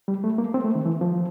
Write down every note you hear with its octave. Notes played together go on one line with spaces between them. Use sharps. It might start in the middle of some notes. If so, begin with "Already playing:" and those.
G3
A3
A#3
C4
A3
D#3
E3
F3